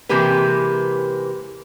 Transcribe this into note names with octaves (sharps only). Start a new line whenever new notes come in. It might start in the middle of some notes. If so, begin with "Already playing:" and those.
C3 E3 G#3 A#3 G4 B4